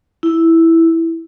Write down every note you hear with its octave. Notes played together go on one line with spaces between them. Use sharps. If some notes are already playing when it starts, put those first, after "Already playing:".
E4